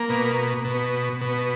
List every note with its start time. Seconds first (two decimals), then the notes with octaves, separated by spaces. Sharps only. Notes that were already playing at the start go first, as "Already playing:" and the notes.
Already playing: A#3
0.09 B2
0.65 B2
1.21 B2